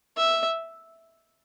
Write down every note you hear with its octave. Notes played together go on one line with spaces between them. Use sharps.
E5